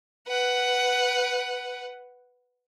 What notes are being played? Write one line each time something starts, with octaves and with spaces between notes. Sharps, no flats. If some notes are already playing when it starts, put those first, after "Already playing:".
B4 F#5